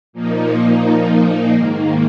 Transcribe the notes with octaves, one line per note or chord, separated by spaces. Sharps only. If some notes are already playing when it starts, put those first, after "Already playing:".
A#2 F3 A#3 D#4
G#2 D#3 A#3